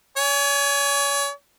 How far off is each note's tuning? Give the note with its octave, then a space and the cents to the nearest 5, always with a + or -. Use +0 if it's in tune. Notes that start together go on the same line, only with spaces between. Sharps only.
C#5 +35 G#5 +0